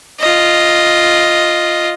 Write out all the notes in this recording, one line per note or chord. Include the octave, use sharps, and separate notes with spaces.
F4 D#5